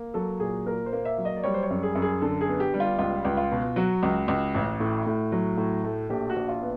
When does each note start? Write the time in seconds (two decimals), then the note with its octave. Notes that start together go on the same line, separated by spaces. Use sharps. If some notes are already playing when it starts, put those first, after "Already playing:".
Already playing: A#3
0.14 F#3 A4
0.40 A#2 G#4
0.66 A#2 A#4
0.86 C5
0.93 A#3
1.05 E5
1.18 F#3
1.25 D#5
1.36 D5
1.43 G3 C#5
1.54 C5
1.63 C#5
1.70 F#2
1.83 G#4
1.95 F#2
2.02 G#4
2.22 D3 A4
2.41 G#4
2.48 B3
2.60 G4
2.74 G3
2.80 F4
2.99 C#2 F4
3.25 C#2
3.37 F4
3.51 B2
3.76 F#3 F#4
4.03 C#2
4.28 C#2
4.54 A1
4.80 A2
5.06 A2
5.32 F#3
5.57 A2
5.84 A3
6.10 A#1 G4
6.30 F#4
6.36 A#1
6.48 F4
6.62 B3